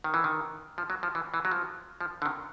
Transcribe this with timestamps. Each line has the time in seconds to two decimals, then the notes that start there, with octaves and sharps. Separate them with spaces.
0.04 D#3
0.14 E3
0.24 D#3
0.78 F3
0.90 F#3
1.03 F3
1.15 E3
1.34 E3
1.45 F#3
1.51 F3
2.01 F3
2.22 D3
2.26 D#3